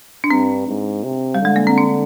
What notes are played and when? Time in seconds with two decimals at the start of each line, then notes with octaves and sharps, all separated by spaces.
0.24 D4
0.31 G2 C4
0.68 G#2
1.04 C3
1.34 G3
1.41 D3 G#3
1.56 A#3
1.67 C4
1.78 D4